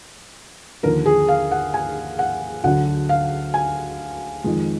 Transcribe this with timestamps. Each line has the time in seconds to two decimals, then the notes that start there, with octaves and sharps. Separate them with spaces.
0.83 D#2 D3 F3 A#4
1.06 G#4
1.29 F5
1.51 F#5
1.74 G#5
2.19 F#5
2.64 D2 D3 F#3 F#5
3.09 F5
3.54 G#5
4.44 F2 D#3 G#3